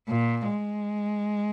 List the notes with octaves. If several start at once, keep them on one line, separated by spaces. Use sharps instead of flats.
A#2
G#3